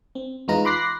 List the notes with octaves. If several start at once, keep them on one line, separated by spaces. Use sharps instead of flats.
C4
E2 G#3 D#4 F4 B4 A#5
B5 C6 D6 F#6 A#6 C7